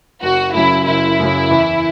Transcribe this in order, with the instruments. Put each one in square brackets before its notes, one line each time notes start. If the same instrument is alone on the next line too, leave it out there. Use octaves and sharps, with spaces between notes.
[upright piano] F#1 [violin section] F#4
[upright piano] F#2 C#3 F#3 [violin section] E4
[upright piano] F#1 [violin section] E4
[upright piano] F#2 C#3 F#3
E2